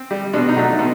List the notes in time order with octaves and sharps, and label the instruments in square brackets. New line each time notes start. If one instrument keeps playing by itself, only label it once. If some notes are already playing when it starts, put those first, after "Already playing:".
Already playing: [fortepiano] C4
G3
B2 D4
D#4
F#3 A3
B2